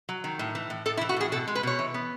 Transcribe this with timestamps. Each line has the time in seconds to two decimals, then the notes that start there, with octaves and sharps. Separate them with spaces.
0.09 F#3
0.24 D#3
0.39 A2
0.55 E3
0.70 A2
0.86 A2 A4
0.97 E4
1.01 E3
1.09 F#4
1.16 A2 G#4
1.32 B2 A4
1.47 G#3
1.55 B4
1.63 B2 C#5
1.79 E3
1.94 B3